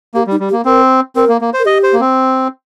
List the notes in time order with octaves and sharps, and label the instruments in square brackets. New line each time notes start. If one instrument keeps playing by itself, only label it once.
[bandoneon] A#3 [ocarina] G4
[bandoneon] G3
[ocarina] D#4
[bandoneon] G3
[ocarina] G4
[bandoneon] A#3
[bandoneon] C4 [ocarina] A#4
[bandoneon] C4 [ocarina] A#4
[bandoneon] A#3
A#3
C5
[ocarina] A#4
[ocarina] G4 [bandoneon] D#5
[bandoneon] C5
A#3
C4